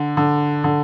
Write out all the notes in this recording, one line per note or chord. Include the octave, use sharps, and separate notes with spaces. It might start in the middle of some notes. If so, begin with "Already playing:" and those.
Already playing: D3
D3
D3